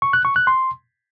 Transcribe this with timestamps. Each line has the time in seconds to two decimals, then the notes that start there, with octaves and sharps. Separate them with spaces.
0.02 C#6
0.13 F#6
0.25 C#6
0.36 F#6
0.47 C6